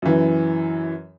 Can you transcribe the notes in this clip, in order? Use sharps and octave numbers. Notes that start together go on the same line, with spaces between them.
F#2 E3